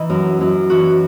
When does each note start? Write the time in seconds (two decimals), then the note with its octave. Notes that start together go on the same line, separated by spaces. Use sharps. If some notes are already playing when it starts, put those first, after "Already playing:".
Already playing: E3 D#4 D#5
0.10 F#2
0.41 F#2
0.70 E3 F#4